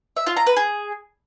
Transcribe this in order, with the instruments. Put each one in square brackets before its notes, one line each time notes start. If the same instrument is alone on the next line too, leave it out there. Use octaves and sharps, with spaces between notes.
[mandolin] E5
F4
A#5
B4
G#4